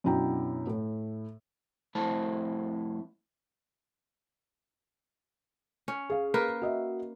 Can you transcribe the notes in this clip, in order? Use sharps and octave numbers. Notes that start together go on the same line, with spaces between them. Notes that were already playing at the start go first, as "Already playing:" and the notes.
F#2 B2 D4 E4 G5 A#5
A2
F2 A3 E4 C5 A5
C#4
G#4 F5
A#3 A#4 B4
F#4 D#5 E5